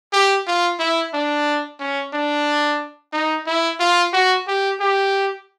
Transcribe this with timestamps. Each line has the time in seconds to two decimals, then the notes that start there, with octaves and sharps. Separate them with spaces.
0.13 G4
0.47 F4
0.79 E4
1.13 D4
1.80 C#4
2.13 D4
3.13 D#4
3.46 E4
3.80 F4
4.13 F#4
4.47 G4
4.80 G4